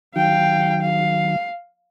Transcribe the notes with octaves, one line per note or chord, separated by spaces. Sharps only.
D#3 F#3 F5 G5
F5